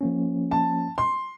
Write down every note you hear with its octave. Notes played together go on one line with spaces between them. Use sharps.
F3 A#3 C#4
A5
C6